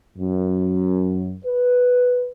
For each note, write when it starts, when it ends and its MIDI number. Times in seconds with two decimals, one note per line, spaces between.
0.19 1.34 42
1.45 2.30 71